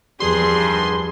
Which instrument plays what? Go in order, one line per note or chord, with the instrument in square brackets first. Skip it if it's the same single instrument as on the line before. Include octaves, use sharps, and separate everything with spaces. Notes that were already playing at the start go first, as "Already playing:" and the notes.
[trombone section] G#1 G2 [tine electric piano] E2 F3 G4 [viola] G#4 [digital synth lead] C6